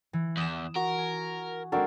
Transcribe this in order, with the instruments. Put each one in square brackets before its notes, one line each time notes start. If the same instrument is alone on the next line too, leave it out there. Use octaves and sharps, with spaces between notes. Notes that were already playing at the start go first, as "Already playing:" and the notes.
[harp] E3
[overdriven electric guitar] E2 [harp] D#6 E7
[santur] F#4 [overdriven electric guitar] A#4
[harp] G#5
[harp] G#3 C4 D4 [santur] F#4 A4 A#4